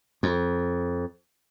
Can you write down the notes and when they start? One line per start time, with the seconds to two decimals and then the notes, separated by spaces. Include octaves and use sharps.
0.23 F2